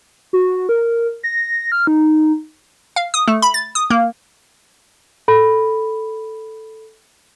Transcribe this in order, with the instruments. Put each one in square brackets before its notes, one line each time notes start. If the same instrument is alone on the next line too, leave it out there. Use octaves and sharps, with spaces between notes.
[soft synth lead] F#4
A#4
A#6
F6
D#4
[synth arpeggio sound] F5
D#6
A3
B5
A6
D#6
A#3
[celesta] A4 B5